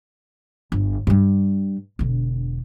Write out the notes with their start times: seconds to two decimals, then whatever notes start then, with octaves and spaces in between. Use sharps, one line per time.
0.72 G1
1.07 G2 G3
1.99 E1 D3